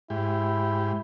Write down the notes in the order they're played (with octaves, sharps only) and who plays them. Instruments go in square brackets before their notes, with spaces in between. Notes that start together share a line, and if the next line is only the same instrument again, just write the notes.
[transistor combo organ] G#2 G4 [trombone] E4